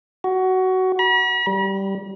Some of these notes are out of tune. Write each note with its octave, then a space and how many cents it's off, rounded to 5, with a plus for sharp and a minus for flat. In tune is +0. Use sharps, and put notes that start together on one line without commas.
F#4 +15
B5 -45
G3 -10